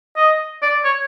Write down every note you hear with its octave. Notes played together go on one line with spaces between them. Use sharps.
D#5
D5
C#5